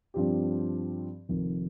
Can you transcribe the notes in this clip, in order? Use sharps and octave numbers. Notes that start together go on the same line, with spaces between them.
G2 F3 C4 G4
F1 F2 D#3